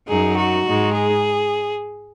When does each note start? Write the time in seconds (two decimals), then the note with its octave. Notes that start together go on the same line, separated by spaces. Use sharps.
0.09 F#2 F#3 D#4 G#4
0.37 F#4
0.65 G#2 G#3 D#4
0.94 G#4